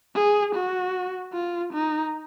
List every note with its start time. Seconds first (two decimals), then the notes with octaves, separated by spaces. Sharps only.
0.15 G#4
0.55 F#4
1.34 F4
1.73 D#4